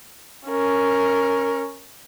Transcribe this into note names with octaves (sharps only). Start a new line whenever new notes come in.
C#4 A#4